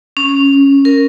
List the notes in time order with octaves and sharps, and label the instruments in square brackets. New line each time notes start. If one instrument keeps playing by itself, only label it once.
[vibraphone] C#4
A#4